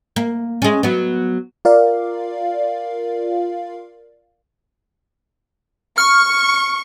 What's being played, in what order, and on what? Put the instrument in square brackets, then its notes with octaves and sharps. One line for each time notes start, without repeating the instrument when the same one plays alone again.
[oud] A#3
G#3 C#4
F#3 B3
[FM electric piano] F4 A#4 D5 F5
[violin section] C#6 [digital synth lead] F6